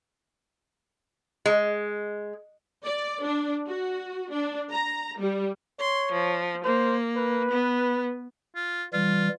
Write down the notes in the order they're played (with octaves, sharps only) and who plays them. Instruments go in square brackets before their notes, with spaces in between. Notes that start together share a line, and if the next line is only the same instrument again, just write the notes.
[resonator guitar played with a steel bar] G#3
[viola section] D5
D4
F#4
D4
A#5
G3
[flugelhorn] C#5 [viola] C6
[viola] F3
[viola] A#3 [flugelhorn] C5
[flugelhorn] B4
[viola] B3
[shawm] F4
[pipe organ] E3 G3 [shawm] F4